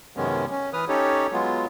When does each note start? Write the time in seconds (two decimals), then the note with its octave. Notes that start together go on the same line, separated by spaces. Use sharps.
0.17 F#2 C3 D#3 G#3 B3 C#4
0.51 C#4
0.73 E3 B4 D#6 F6
0.88 C#4 D#4 G4 A4 C#5
1.33 F#3 G#3 B3 F4